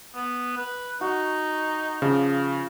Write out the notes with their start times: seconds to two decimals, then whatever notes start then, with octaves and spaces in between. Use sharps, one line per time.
0.15 B3
0.57 B4
1.01 D#4 F#4
2.02 C#3 F3